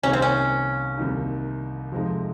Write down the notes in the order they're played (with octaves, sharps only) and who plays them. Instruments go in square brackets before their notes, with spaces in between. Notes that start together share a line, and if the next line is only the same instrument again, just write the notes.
[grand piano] C2 C3 D#3 A#3 D#4 [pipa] C#4
[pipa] C4
C#4
[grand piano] C2 C3 D#3 A#3 D#4
F2 C3 F3 G#3 D#4